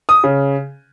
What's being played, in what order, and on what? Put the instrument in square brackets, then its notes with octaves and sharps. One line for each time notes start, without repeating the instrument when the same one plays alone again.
[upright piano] D#6
C#3